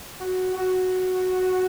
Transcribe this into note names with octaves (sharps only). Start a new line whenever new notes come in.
F#4
F#4